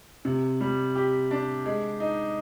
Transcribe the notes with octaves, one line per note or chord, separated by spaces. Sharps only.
C3
G3
G4
D4
G#3
D#4